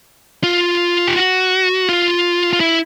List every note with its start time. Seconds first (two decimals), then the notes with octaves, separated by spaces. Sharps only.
0.44 F4
1.08 G4
1.16 F#4
1.89 F4
2.53 F4
2.60 E4